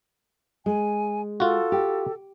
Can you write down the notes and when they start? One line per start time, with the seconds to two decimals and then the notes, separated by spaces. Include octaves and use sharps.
0.66 G#3 G#5
1.40 F4 F#4 A4
1.72 G4